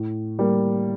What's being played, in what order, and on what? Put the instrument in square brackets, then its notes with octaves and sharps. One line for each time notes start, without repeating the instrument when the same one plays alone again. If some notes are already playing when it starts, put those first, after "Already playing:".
Already playing: [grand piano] A2
G3 A#3